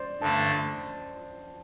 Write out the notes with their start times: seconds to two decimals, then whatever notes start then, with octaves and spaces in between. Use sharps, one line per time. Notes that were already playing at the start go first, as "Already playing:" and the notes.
Already playing: C5 D5
0.20 G2 D3 A3 A5